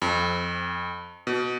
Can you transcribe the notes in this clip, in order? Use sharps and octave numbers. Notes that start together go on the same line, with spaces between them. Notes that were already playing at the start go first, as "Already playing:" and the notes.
F2
B2